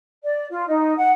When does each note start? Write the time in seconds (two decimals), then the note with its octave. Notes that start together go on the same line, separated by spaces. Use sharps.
0.23 D5
0.50 F4
0.67 D#4
0.96 F#5